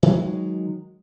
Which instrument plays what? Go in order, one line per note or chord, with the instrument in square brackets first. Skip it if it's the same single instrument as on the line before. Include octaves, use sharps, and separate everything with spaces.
[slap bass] D#3 F#3 G#3